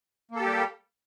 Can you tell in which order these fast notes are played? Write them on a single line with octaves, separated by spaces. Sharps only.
A#3 A4 G4 G3